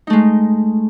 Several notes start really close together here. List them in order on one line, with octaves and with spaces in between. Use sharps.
D#4 A3 G#3